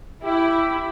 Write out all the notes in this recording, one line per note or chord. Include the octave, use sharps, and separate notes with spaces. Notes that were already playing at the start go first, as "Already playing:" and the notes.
E4 G4